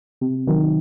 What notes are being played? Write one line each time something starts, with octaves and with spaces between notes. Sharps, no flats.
C3
D#3 F#3